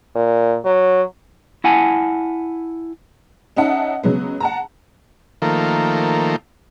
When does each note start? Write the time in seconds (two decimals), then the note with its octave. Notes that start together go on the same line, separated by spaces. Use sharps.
0.15 A#2
0.65 F#3
1.64 E4 F#5 G#5 A5
3.57 C#4 D#4 E5 F#5 A5
4.03 C#3 F#3 G#3 B3
4.40 F#5 A5 A#5
5.42 D#3 F3 A3 A#3